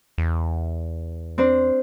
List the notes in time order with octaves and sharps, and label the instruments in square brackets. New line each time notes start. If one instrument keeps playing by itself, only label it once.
[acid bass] E2
[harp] C4 D4 C5